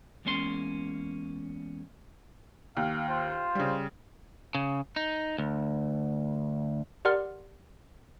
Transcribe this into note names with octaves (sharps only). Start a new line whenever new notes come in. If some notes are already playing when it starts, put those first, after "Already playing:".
E2 G#3 A#3 C#4 F#4 C6
D#2 F5
F4 C5
C#3 G3
C#3
D#4
D2
G4 A#4 D5 F#5 C6 F6